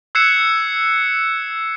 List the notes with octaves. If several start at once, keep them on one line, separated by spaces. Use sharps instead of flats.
E6 F#6 G#6 C7 C#7 E7